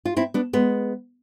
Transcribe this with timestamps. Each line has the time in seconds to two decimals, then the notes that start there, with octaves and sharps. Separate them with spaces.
0.05 F4
0.17 C4 E4
0.34 B3 D4
0.53 G#3 B3